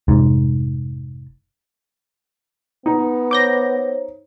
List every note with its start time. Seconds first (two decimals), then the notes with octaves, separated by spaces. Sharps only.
0.08 F1 G#2
2.86 B3 D#4
3.31 C5 C#5 D6 G6 A#6